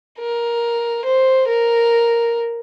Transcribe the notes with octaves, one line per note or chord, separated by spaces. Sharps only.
A#4
C5
A#4